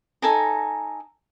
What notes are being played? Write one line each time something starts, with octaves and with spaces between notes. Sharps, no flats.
D#4 A4 G#5 A#5